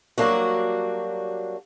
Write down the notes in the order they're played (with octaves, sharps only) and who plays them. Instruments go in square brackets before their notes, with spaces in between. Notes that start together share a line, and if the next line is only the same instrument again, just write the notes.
[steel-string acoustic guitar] F#3 G3 A#3 D4 F#4